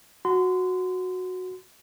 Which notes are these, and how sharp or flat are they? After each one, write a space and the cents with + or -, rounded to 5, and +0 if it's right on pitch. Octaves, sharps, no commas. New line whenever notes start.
F#4 -10 C6 -30